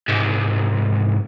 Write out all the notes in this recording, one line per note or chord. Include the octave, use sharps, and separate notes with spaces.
C2 G#2